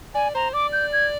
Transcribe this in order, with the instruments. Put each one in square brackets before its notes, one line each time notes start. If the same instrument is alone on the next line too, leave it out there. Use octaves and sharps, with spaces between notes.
[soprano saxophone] D5 [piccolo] G#5
[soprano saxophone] C5 [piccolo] A#5
[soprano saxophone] D5 [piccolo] D6
[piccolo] G6
G#6